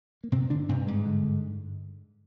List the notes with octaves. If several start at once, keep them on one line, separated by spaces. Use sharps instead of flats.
A#3
G2 C3 C4
D3 D4
G2 C3 C4
G#2 G#3
D3